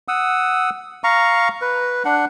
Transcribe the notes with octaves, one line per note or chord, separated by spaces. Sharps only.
F#5 D#6 E6
F5 A#5 C#6
B4
D4 F#5